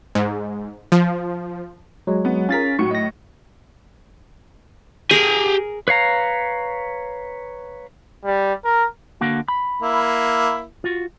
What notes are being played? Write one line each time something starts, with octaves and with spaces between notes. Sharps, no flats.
G#2
F3
F#3 G#3
B3
C#4 F4 G#4 A#4 A6 B6
A2 F#3 F#4 C#6 C#7
D#5 A#6
G4 G#4 A#4 G#5
B4 C#5 F5 A#5
G3
A#4
D3 A#3 F#4
B5
A#3 E4
F4 F#4